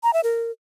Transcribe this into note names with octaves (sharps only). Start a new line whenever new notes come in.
A#5
E5
A#4